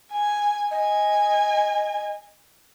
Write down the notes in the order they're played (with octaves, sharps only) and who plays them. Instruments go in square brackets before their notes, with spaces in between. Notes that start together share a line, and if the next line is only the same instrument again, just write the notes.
[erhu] G#5
[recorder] D#5 [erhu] G#5